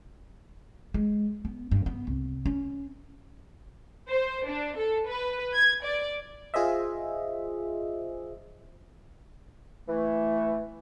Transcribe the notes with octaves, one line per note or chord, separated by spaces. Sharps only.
G#3
B3
G2
B3
C2
C#4
C5
D4
A4
B4
G#6
D5
F4 G#4 C5 D#5 E5
E3 A3